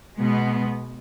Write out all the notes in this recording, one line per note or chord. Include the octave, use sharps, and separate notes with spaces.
B2 G#3 B3